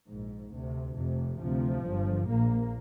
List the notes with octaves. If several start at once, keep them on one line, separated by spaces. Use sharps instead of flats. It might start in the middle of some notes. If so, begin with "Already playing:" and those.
A#1 G#2
D2 C3
F1 F2 C3
D2 C3 F3
G1 G2
A#1 A#2 A#3